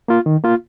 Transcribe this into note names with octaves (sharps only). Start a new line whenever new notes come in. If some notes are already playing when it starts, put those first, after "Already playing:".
A#3 F4
D#3
A#3 F4